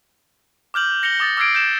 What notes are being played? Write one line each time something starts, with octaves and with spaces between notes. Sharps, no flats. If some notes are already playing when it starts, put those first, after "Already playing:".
D6 F6 G6 F#7
A#6 C#7 F7 G7
D6 D#6 A6
D6 E6 F6 G#6 C7 D7
G6 E7